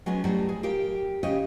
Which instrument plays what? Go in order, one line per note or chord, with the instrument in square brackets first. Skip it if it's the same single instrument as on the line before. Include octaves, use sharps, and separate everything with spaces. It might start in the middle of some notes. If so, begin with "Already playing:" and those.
[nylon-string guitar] F#3 G#3 B3 C#4
A2 F#3 G3
G#4
G4 A#4 F5 G5
C#3 G4 C#5 D#5